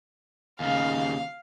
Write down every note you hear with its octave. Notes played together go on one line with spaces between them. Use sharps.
D#2 C#3 F5